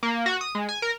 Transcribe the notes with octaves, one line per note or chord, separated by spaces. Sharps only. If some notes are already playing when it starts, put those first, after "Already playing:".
A#3
F#4
D#6
G#3
G#5
A#4